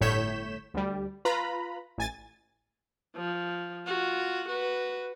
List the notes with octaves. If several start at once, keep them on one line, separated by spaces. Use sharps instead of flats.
G1 A2 C#5 G6 B6 E7
D2 G3
F4 B4 A#5 B5
A1 G#5 A6
F3
F4 F#4
F#4 B4